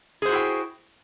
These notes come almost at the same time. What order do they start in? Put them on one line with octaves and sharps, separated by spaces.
G#4 C5 F#4 E4 G5